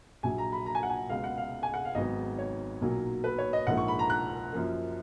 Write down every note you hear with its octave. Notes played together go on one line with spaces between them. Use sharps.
A#1 A#2 F#3 G#5
A#5
B5
A#5
G#5
F#5
G#5
C#2 B2 G#3 B3 F5
F#5
F5
G#5
F#5
F5
G#1 G#2 F#3 B3 D#5
C#5
B1 A#2 F#3 A#3
B4
C#5
D#5
A#1 G#2 F3 A#3 F#5
C#6
B5
A#5
F#6
F#2 F3 A#3